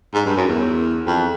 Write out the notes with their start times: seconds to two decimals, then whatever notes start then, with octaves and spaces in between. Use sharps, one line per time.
0.14 G#2
0.26 G2
0.37 F#2
0.48 E2
1.07 F2